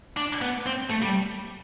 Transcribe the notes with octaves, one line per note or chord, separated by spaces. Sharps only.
D4
B3
C4
A3
G3